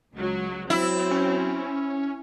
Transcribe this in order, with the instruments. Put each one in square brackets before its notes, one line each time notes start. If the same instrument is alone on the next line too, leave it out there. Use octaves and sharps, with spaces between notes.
[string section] C#2 F#3
[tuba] F#3 [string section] C4 [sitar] E4
[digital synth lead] C#4